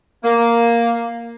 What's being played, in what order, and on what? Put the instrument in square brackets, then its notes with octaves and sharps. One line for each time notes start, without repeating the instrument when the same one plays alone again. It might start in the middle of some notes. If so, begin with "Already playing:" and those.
[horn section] A#3